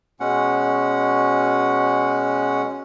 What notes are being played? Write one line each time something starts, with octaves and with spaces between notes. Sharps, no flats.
B2 G#3 C#4 F#5